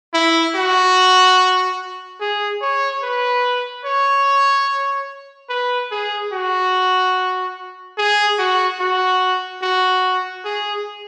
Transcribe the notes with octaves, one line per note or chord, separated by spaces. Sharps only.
E4
F#4
G#4
C#5
B4
C#5
B4
G#4
F#4
G#4
F#4
F#4
F#4
G#4